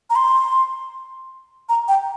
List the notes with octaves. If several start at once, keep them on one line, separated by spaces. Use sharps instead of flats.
A#5
C6
A#5
G5